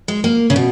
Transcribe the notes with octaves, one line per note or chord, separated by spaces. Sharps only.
G#3
A#3
C#3
B2